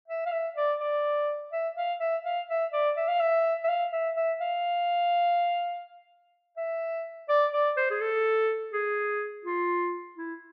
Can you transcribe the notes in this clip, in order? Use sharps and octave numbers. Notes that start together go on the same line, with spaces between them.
E5
F5
E5
D5
D5
E5
F5
E5
F5
E5
D5
E5
F5
E5
E5
F5
E5
E5
F5
E5
D5
D5
C5
G#4
A4
G#4
F4
E4